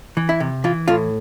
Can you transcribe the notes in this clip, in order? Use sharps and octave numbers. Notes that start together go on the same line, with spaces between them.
E3
E4
C3
E3 F4
A2 F4